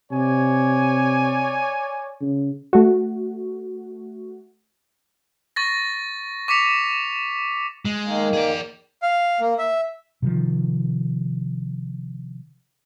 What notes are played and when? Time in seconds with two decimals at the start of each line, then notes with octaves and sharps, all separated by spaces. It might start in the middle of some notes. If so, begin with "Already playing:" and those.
0.12 C3 C#5 D5 G#5
2.21 C#3
2.73 A3 F#4
5.56 C#6 A6 A#6
6.48 C#6 D6 B6 C#7 F7
7.85 G#3
8.04 D#3 A#3
8.33 G#4 D5
9.02 F5
9.40 A#3
9.58 E5
10.22 C3 D#3 F3